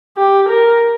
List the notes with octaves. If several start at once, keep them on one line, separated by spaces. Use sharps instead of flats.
G4
A#4